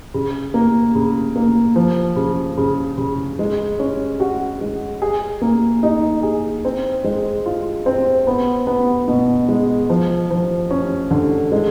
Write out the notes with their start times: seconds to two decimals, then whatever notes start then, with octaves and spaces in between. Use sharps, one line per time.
0.14 C#3
0.54 A#3
0.95 C#3
1.36 A#3
1.76 F3
2.16 C#3
2.58 C#3
2.98 C#3
3.39 G#3
3.79 C#4
4.20 F#4
4.61 G#3
5.02 G#4
5.42 A#3
5.83 D#4
6.23 G#4
6.65 C4
7.04 G#3
7.46 F4
7.86 C4
8.27 B3
8.67 B3
9.08 B2
9.49 G#3
9.90 F3
10.31 F3
10.71 C#4
11.11 D3
11.52 G#3